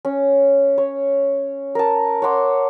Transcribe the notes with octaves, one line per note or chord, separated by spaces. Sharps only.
C#4
C#5
A#4 A5
C#5 F#5 C6 D6